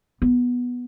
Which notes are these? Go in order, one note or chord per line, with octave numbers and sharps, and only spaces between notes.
B3